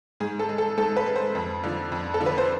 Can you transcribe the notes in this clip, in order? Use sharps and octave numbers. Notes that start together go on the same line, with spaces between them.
G#2 G#4
A4
G#3
A4
G#2 A4
B4
G#3
C5
F2
D3 F3
F2
A4
D3 F3
B4
C5